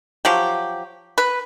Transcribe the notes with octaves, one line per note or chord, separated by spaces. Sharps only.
F3 F#3 G4
B4